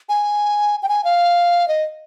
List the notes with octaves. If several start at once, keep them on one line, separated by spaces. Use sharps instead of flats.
G#5
G5
G#5
F5
D#5